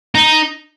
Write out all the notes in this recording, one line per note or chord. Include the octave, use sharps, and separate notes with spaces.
D#4